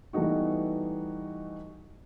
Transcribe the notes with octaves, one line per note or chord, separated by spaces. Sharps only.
E3 G3 A3 B3 D#4 F#4